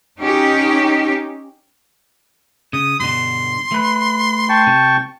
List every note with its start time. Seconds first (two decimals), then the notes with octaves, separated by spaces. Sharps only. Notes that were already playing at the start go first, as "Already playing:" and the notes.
0.20 C#4 D#4 G4
2.73 C#3 D#6
3.00 G2 B2 D3 C6
3.72 A3 B4
4.49 G5 A5 C#6
4.67 C3